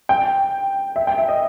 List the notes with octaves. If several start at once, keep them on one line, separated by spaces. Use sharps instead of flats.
G5
E5
G5
E5
D#5